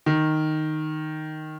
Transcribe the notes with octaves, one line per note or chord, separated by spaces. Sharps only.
D#3